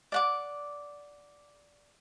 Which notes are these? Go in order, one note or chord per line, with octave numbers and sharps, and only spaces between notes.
D5 F#5 D6